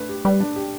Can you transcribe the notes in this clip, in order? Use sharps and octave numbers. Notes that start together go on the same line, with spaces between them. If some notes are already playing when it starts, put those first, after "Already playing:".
Already playing: A3 D4 B4
G4
G3 B4
D4
G4